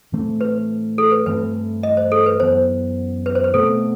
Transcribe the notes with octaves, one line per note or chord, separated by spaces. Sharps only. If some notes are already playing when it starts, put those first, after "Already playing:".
A2 E3 A3 C4
B4
A4
B4
G2 E3 A3 C4 B4
D#5
C5
A4
B4
F#2 E3 B3 C5
B4
C5
B4
B2 A3 C4 A4